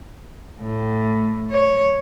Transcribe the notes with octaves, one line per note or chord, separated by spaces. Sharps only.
A2
C#5